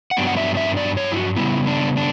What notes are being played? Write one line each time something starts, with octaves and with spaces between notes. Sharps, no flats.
F#5
G2 F#3 B3 D4 G5
F#5
E5
E5
D5
C#5
E4
F#4
C#3 G3 B3 E4
D4
D4